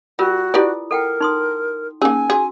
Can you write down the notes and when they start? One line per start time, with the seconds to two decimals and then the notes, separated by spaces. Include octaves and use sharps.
0.19 G3 F4 F#4 A#4
0.54 E4 F4 G4 B4 D5 D#6
0.91 A4 A#4 F#5 G5
1.21 D#4 C6 D#6
2.02 A#3 C#4 D#4 G#4 A#4 G#5
2.30 F#4 G#4